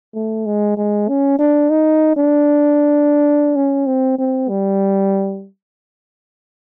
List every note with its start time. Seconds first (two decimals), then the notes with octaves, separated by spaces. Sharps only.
0.14 A3
0.46 G#3
0.77 G#3
1.08 C#4
1.39 D4
1.70 D#4
2.16 D4
3.56 C#4
3.86 C4
4.18 C4
4.49 G3